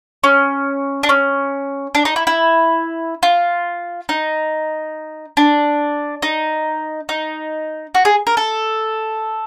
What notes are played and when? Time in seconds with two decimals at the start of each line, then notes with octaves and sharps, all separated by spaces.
0.24 C#4
1.03 D4
1.09 C#4
1.95 D4
2.05 D#4
2.16 E4
2.27 E4
3.23 F4
4.09 D#4
5.37 D4
6.22 D#4
7.09 D#4
7.95 F#4
8.05 G#4
8.27 A#4
8.37 A4